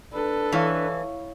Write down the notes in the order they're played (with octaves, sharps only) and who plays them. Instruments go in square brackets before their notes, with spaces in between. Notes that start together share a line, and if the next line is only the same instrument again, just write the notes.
[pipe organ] D4 B4 [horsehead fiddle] A4
[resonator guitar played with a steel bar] E3 [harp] E4 C#5 F5